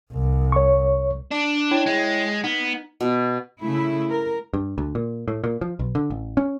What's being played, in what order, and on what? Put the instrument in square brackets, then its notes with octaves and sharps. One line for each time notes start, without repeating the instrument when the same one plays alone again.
[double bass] C2
[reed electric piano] C#5 C#6
[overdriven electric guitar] D4
[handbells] E4 C#5 G5
[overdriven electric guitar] G#3
[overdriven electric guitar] B3 [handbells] D#4
[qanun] B2
[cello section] C#3 A3 E4
A#4
[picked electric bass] G2
D2
A#2
A2
A#2
F3
B1
D3
A1
C#4